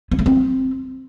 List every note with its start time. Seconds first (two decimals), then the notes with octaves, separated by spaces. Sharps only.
0.11 B3
0.19 A3
0.26 C4